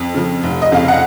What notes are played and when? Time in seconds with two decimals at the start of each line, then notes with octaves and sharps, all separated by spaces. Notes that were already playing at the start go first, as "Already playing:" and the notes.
Already playing: F2
0.14 C#3 F3
0.43 F1
0.62 D#5
0.72 F2 C#3 F5
0.88 F#5